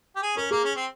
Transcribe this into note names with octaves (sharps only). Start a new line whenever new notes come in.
G4
G#4
C#4 A#4
A#3 G#4
C#4
C4